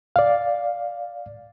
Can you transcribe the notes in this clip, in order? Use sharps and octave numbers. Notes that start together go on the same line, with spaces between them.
D5 F5